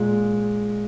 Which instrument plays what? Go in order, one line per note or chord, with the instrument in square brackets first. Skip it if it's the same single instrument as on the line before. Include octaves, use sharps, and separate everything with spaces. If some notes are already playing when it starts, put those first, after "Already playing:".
Already playing: [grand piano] A#2 G#3